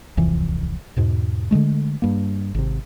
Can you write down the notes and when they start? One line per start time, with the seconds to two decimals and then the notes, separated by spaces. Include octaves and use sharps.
0.17 D1 C2 F2 E3
0.96 E2 G#2 B2
1.51 D3 E3 G#3 A3
2.02 G2 A#3
2.54 G#1 C3